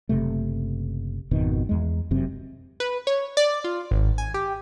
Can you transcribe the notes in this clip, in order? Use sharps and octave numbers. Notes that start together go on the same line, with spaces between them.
F#1 D#2 C3 A3
G#1 F2 B2 D#3
E2 G#3
F1 F#2 C3 C4
B4
C#5
D5
F4
G#1
G#5
G4